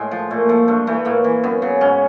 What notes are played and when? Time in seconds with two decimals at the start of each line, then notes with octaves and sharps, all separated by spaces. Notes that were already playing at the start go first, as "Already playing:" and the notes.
Already playing: A2 G#3
0.11 F3
0.31 A#2 A3
0.49 F3 A3
0.68 G2 A3
0.87 E3 A3
1.05 A2 A#3
1.24 E3
1.44 F#2 B3
1.62 C#3 F#3
1.81 G#2 C#4